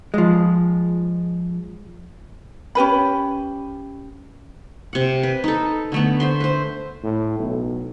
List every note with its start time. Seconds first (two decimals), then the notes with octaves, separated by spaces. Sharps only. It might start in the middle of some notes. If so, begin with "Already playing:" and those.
0.14 F3 G#3
2.75 C#4 G4 B4 B5
4.93 C3 F#5
5.23 B4
5.44 D#4 A4
5.92 D3 A3 B3
6.20 C5 E5 C6
6.40 B4 C5
7.03 A2
7.38 B1